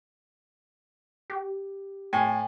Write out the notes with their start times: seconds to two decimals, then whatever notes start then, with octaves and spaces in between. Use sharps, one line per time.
1.30 G4
2.13 A2 G5 G#5